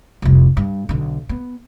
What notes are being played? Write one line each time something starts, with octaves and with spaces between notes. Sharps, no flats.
F1 C2
G2
B1 D3
B3